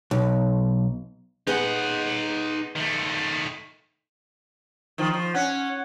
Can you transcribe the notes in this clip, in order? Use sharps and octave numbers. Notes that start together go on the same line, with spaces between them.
B1
B3 D#4 G#4 B4 F#5
D#3 A3
D#3 F3
F3
C#4 F#5